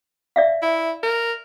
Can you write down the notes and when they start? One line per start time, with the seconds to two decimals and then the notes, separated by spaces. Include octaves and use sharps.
0.36 D5 E5 F5
0.62 E4
1.03 A#4